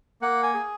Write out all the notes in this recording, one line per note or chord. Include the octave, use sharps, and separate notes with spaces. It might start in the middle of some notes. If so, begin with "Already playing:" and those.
A#3 F#5
G#5
G#4